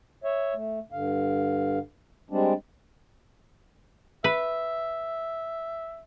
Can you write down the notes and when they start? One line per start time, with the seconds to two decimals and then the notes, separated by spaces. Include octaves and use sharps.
0.24 C#5 E5
0.54 A3
0.92 G2 D3 F5
2.31 G3 G#3 C4 D4
4.24 B4 E5